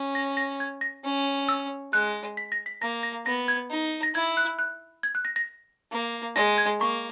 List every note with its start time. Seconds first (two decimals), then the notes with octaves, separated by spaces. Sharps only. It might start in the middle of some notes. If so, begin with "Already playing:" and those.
Already playing: C#4
0.15 A#6
0.37 A#6
0.60 G#6
0.81 A#6
1.04 C#4
1.49 E6
1.93 G#3 F#6
2.37 B6
2.52 A#6
2.66 B6
2.82 A#3 A#6
3.03 A#6
3.26 B3 A#6
3.48 G#6
3.70 D#4
4.03 A#6
4.15 E4 G#6
4.37 F#6
4.59 F#6
5.03 G#6
5.15 F#6
5.25 A#6
5.36 A#6
5.92 A#3
6.36 G#3 A#6
6.58 G#6
6.80 A#3 C#6